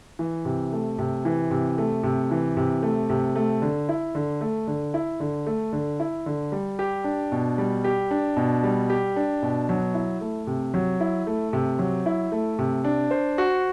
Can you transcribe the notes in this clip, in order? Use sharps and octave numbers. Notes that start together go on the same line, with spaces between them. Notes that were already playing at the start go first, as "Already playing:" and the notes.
E3
C3
A3
C3
E3
C3
A3
C3
E3
C3
A3
C3
A3
D3
E4
D3
A3
D3
E4
D3
A3
D3
E4
D3
G3
G4
D4
B2
G3
G4
D4
B2
G3
G4
D4
B2
F#3
E4
A3
C3
F#3
E4
A3
C3
F#3
E4
A3
C3
D4
C5
F#4